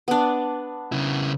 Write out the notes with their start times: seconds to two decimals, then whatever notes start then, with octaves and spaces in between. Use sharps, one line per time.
0.08 B3 D4
0.92 C#3 E4